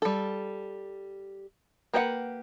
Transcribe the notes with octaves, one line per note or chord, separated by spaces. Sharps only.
G3 A4
A#3 G4 B4 D#5 F#5